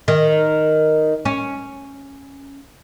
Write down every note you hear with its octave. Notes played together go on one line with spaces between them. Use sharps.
D#3
C#4